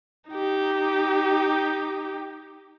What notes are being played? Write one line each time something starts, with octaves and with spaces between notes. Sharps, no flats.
D#4 G4